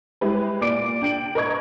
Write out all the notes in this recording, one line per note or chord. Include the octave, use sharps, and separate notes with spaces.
G3 G#3 E4 G4 B4
A#2 D5 D6 D7
D4 G5 D7 F#7
A#4 B4 D#5 C#6 G#6